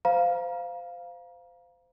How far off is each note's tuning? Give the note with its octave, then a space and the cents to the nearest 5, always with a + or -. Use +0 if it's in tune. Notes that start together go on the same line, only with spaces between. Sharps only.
C5 -25 F5 +0 A#5 +30